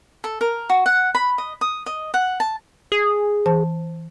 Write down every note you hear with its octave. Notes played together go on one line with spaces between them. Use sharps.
A4
A#4
F#4
F#5
B5
D#5
D#6
D#5
F#5
A5
G#4
E3 C5 A5